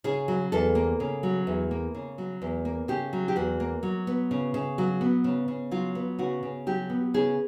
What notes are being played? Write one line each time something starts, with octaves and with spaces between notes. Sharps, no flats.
C#3 G#4
F#3
E2 A4
A#3
C#3
F#3
E2
A#3
C#3
F#3
E2
A#3
C#3 G4
F#3
G4
E2 F#4
A#3
F#3
B3
C#3
C#3
F#3
B3
C#3
C#3
F#3 F4
B3
C#3 F#4
C#3
F#3 G4
B3
C#3 G#4